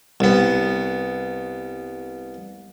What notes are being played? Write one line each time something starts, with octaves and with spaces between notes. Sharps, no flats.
C2 B3